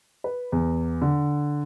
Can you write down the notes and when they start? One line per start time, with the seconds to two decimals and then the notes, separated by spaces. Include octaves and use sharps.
0.24 B4
0.52 E2
1.02 D3